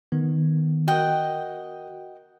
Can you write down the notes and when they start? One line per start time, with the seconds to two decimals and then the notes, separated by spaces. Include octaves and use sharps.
0.12 D#3 B3
0.88 F#4 A#4 D#5 F#5 G5